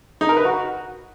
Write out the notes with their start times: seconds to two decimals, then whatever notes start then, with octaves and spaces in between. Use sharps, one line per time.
0.21 D#4
0.29 A#4
0.37 B4
0.45 F#4